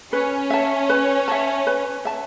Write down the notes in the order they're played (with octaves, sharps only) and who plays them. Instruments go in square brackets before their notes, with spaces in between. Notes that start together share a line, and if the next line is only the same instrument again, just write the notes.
[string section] C#4 [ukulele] B4
[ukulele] E5 A5
B4
E5 A5
B4
E5 A5